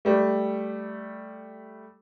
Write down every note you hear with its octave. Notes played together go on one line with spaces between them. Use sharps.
G3 A3